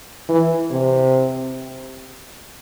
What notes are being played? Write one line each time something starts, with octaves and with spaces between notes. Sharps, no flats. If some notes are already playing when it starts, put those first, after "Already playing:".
E3
C3